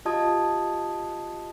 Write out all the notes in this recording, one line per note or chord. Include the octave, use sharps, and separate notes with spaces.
F4 G4 D#5 A5 D#6 G#6